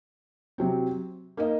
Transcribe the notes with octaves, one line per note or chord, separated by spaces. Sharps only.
C3 F#3 C4
A#3 D#4 A#4 D#5